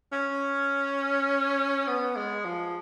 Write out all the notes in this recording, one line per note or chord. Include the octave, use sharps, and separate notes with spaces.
C#4
B3
G#3
F3